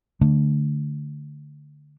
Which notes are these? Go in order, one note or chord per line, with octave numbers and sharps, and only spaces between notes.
D3 A3 D4